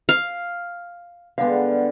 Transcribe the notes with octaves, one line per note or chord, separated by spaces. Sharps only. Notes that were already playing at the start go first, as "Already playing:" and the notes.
F5
D3 G3 G#3 B3 F5